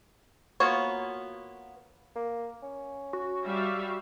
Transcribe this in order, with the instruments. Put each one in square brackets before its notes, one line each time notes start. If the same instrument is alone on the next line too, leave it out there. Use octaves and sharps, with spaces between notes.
[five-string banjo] A#3 B3 F4 F#4 C#5
[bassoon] A#3
C#4
[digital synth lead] F#4
[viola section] G3 E5 F5